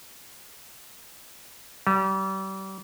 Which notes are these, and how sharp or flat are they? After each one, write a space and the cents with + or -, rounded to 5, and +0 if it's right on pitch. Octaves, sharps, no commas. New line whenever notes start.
G3 -35